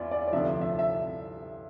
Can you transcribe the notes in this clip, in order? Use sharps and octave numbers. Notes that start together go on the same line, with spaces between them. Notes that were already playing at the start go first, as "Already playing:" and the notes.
Already playing: E2 E3 E4 F4 D5
D5
D5
D2 C3 F3 E5
E5
E5